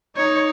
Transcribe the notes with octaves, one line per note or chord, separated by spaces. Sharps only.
D#4 C#5